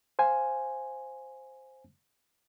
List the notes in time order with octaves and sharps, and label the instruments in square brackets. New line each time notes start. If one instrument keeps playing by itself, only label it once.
[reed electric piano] C5 F5 G#5